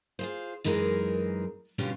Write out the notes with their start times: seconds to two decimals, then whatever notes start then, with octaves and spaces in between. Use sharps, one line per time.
0.19 F4 G#4 C5
0.64 F#2 E3 G#3 D#4 G#4 A#4
1.78 B2 D3 G3 C#4 F4 G4